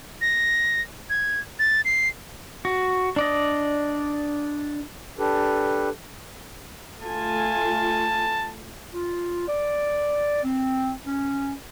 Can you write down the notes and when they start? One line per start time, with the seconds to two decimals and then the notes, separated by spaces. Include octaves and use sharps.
0.21 A#6
1.10 G#6
1.59 A6
1.85 C7
2.65 F#4
3.16 D4 D5 D#5
5.19 D4 G4 A4 B4
7.00 A3 F4 G#5 A5
8.93 F4
9.48 D5
10.43 C4
11.05 C#4